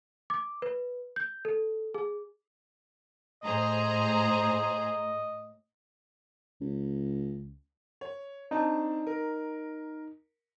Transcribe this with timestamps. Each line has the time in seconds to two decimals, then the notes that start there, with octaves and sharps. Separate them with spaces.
0.30 D6
0.62 B4
1.16 G6
1.45 A4
1.94 G#4
3.43 A2 G#4 C5 D#5 A#5
6.61 C#2
8.01 C#5
8.51 C4 D4 D#4 A5
9.07 A#4